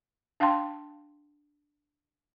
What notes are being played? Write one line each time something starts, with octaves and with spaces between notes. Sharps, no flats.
D4 F5 G5 A5 C6